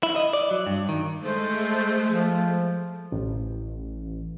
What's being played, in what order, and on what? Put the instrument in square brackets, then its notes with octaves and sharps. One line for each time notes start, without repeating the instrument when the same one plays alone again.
[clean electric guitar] E4
D#5
D5
F#3
G2
D#3
[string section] G#3 A3 [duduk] C5
[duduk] F3
[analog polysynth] A1